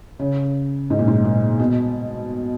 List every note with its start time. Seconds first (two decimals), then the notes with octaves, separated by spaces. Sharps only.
0.19 C#3
0.90 G#2
0.99 A#2
1.08 G#2
1.24 A#2
1.60 B2